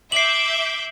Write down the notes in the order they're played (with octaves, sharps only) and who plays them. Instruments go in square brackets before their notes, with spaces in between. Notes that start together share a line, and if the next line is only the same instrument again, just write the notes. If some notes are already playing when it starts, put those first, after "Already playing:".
[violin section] E5 D6 G6 [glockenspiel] C7 F#7